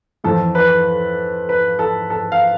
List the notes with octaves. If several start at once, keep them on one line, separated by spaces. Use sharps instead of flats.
F2 E3 A4
B4
B4
A4
A4
F5